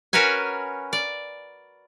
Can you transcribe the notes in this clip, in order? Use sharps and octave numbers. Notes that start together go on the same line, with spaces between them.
C#4 F#4 A#4 B4 C#5 G#5
D5